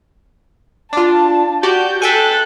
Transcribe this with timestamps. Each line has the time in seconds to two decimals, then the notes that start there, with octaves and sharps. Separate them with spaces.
0.93 D4 F4 A5
1.63 F#4 G4 D5 G6
2.02 A4 E5 G5 G#5 F#6